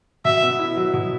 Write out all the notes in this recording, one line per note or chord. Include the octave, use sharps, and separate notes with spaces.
B2 E5
B3
E4
F#3
B2